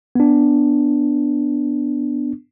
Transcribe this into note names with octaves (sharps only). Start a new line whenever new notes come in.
B3 D4